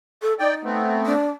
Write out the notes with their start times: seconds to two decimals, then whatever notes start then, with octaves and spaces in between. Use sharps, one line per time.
0.22 A4
0.39 D#4 D5 G5
0.64 A3 B3 C4
1.05 D4